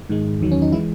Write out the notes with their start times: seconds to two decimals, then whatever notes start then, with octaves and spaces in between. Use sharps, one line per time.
0.09 G#2 D#3 G#3
0.41 E2 D#3 F#3
0.52 C#4
0.62 D#4
0.72 E3 G#3 E4